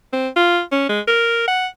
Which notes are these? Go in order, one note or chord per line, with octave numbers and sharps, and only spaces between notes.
C4
F4
C#4
G#3
A#4
F#5